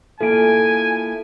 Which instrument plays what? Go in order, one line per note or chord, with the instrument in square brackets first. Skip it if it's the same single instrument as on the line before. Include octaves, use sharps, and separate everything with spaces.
[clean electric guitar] A#3 E4 F4 [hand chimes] A4 D7 [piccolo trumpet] G#5